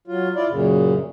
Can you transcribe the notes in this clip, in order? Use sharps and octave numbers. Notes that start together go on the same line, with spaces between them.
F#3 F4
E4 F4 D5
F#2 A#2 C#3